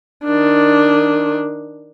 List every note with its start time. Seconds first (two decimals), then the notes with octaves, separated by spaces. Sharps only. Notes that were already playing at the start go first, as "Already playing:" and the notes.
0.24 D#3 D4